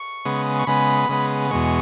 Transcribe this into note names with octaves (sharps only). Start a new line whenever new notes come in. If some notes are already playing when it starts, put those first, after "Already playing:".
Already playing: C#6
C#3 G#3 B3
C#6
C#3 G#3 B3 B5
C#3 G#3 B3
E2 B2 G#3 C#6